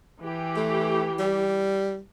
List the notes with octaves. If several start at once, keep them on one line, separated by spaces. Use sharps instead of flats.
E3 G4
A3
G3